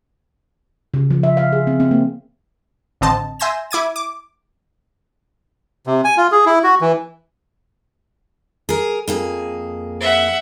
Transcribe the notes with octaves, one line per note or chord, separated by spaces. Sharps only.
C#3
F3
E5
F5
G#4
C4
C4
A#3
A1 D3 C4 D#5 A5
E5 G#5 C6 G6 A#6 E7
E4 D6 G#6 D#7
D6
C3
G#5
F4
G#4
E4
F#4
E3
G#4 A#4
F2 A#3 G#4
E5 F#5